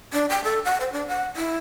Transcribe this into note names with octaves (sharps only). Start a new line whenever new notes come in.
D4
G5
A4
F#5
C5
D4
F#5
E4